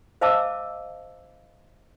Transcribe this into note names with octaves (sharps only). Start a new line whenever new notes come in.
C5 D#5 F5 A5 D6 E6